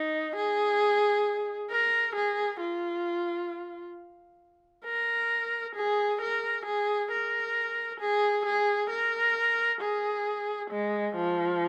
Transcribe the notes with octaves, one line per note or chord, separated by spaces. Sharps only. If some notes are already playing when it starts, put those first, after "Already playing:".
Already playing: D#4
G#4
A#4
G#4
F4
A#4
G#4
A#4
G#4
A#4
G#4
G#4
A#4
G#4
G#3
F3